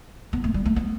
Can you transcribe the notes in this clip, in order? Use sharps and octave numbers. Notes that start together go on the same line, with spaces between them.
B3
A3
G3
A3
B3